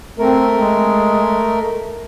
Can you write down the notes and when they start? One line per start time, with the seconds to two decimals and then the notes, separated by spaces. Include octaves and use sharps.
0.19 A3 C4 A#4
0.56 G#3